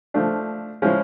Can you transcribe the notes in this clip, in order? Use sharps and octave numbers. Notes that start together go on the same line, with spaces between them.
F3 A3 D4
F3 G#3 C#4 E4